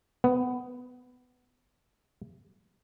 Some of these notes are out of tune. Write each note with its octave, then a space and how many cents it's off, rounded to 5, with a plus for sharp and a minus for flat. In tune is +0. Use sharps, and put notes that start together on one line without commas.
B3 +15